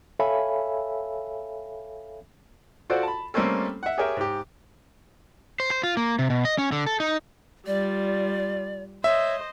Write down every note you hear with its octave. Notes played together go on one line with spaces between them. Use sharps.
A4 C#5 E5 F5 G#5 B5
F4 F#4 A4 C5 D5 F#5
A5 B5
G3 A3 A#3 C4 C#4 A4
E5 F#5
G4 G#4 A#4 C#5 E5 G5
G#2 G4
C5
C5
F4
A#3
C3
B2
D#5
C#4
D3
A4
D#4
G3 F4 D5
C5 C#5 D#5 E5